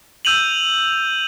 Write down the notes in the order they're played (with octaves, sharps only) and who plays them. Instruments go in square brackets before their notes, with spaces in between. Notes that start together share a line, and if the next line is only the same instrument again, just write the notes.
[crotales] E6 G6 D#7 F7 F#7